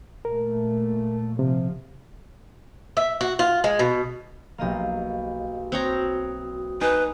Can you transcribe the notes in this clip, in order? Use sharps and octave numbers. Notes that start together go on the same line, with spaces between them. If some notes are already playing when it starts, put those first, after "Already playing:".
A#2 A3 A#4
C3 F3
E5
F#4
F4
G#3
B2
B1 A#3 G4 D#5 F5
C4 F#4 C#5 A#5 D#6
D#4 B4 G#5